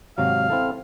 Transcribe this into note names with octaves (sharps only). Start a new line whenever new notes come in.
G#1 C3 F#3 F5
C4 E4 A4